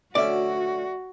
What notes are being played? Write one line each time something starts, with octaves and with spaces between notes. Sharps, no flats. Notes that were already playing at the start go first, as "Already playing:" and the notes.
D2 C#4 F#4 D5 E5